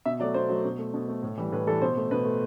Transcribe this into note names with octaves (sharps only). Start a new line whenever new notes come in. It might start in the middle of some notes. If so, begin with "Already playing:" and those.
B2 E5
F#3 A3 D5
B2 C5
F#3 A3
B2
A3
B2
A3
A2
E3 G3
A2 B4
E3 G3 A4
B2 C5
A3
B2 B4
A3